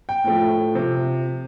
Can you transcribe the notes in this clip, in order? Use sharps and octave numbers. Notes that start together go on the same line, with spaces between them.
G5
A2 F3 A3
C3 F3